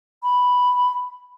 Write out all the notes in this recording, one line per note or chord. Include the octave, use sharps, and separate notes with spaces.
B5